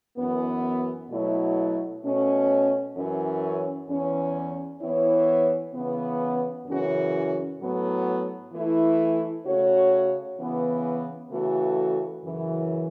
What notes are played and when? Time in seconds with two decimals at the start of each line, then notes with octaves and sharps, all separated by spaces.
0.17 F#2 E3 B3
1.09 B2 F#3 A3 E4 C#5
2.02 B2 A3 C#4
2.95 F#2 E3 C#4
3.88 E2 E3 C#4
4.81 E3 B3 E4 C#5
5.74 C#3 E3 B3
6.66 F#2 C#3 E3 C#4 F#4
7.59 A2 F#3 B3
8.52 E3 A3 E4
9.45 C#3 A3 F#4 C#5
10.37 C#3 E3 B3
11.30 C#3 E3 A3 F#4 A4
12.23 F#2 C#3 E3